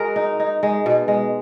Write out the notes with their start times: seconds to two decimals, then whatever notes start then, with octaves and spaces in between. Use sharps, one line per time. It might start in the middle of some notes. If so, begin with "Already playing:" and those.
Already playing: G#3 F#4 G#4 A#4
0.16 D#4
0.40 D#4
0.63 G#3
0.86 B2
1.08 G#3